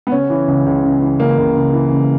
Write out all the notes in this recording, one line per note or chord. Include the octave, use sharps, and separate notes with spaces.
B3
C#3 C#4
E3
C#2
C#2
C#3
E3
C#2 A#3
C#2
C#3
E3
C#2